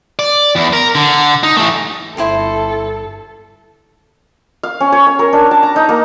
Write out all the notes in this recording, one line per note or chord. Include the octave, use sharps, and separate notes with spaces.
D5
E2
A#4
D3
D#4
E3 A3
G1 E4 A4 C5 G5
F5
C#4
C#5
G#5
A#4
D4
A5
A#5
D#4
A#3